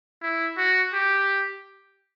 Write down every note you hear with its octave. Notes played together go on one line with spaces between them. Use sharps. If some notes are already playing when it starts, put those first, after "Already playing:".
E4
F#4
G4